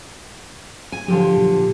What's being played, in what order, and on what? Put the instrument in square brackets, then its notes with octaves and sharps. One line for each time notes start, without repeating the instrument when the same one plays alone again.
[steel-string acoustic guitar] G#5
[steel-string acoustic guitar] D3 F3 G4 [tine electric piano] F#3
[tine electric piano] A#2